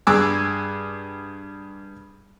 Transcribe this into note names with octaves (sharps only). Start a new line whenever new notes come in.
G2 G#4 G#5 D6 E6 F#6